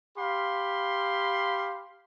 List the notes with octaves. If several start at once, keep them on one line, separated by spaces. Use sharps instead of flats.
G4 F5 B5 C6